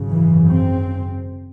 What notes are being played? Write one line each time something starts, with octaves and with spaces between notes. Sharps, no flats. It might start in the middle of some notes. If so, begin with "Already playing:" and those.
Already playing: G#1 F#2 C#3
E3
C4